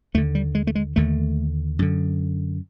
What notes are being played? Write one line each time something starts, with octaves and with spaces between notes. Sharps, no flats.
D#2 D3 A3
G3
G#3
A3
G#3
D#2 D3 A3
F#2 D3